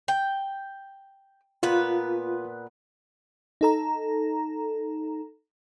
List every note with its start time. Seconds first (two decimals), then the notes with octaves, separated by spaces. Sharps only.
0.08 G5
1.63 A#2 B3 F4 B4
3.61 D#4 A4 A#5